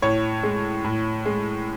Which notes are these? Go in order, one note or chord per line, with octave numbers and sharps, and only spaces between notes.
A2 C#5
G#3
A2
G#3